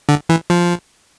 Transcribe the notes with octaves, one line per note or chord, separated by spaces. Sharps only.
D3
E3
F3